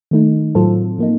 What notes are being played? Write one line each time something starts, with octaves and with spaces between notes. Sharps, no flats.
D#3 A3 D#4
A2 F#3 C4 F4 A4
F3 A#3 D#4